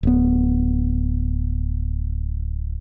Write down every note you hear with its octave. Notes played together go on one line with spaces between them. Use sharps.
D1 B3